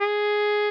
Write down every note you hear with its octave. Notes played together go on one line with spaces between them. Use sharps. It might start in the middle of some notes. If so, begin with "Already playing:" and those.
G#4